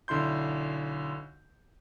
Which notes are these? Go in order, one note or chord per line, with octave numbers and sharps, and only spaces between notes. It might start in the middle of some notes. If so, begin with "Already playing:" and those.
B1 D3 E4 C6 G6